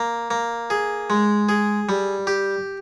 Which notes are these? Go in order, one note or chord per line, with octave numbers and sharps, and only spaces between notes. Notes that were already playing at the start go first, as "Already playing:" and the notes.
Already playing: A#3
A#3
G#4
G#3
G#4
G3
G4